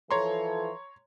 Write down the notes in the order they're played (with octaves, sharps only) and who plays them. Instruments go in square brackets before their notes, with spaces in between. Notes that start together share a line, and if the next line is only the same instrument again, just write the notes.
[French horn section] E3 F3 A4 [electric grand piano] C#5 A#5 C6